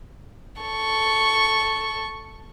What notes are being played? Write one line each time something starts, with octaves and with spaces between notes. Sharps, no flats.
A4 C#6